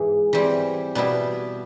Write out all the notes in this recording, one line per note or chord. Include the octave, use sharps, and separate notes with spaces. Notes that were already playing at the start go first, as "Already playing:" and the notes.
Already playing: G#2 E3 G#3
E3 G3 C4
B2 G3 B3 E4